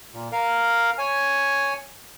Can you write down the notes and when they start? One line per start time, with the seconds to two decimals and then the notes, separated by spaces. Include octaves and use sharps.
0.13 A#2
0.32 A#4 F5
0.98 C#5 G#5